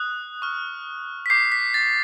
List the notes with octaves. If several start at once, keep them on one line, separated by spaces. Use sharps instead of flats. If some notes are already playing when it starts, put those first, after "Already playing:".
Already playing: D#6 F#6
C#6 F6
B6
D6 G6 C7
B6
A6